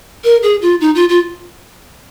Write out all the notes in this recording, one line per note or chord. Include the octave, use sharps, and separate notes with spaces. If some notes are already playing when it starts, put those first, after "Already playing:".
A#4
G#4
F4
D#4
F4
F4